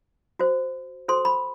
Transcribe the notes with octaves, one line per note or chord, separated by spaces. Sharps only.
F#4 C5
F#4 A4 C5 C6
B5